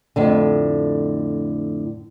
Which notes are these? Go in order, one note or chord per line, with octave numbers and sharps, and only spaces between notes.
F2 A2 D3